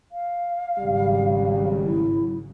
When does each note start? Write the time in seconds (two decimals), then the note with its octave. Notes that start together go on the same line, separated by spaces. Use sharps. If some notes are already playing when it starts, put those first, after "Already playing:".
0.12 F5
0.78 G#1 C#3 F#3 G3
1.84 E4